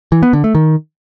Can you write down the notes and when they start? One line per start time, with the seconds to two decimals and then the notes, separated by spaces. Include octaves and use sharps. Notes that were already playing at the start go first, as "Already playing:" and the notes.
0.12 E3
0.23 B3
0.33 D3
0.44 A3
0.55 D#3